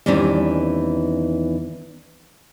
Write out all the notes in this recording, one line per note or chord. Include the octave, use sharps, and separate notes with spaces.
E2 D#3 E3 G3 C4 C#4